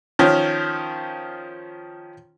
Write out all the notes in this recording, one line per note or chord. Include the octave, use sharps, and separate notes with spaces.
D#3 F3 C#4